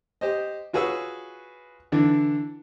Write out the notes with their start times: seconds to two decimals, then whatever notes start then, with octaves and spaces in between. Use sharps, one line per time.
0.21 G4 C5 D#5
0.73 F4 F#4 G#4 B4 C#5 E6
1.92 D3 E3 D4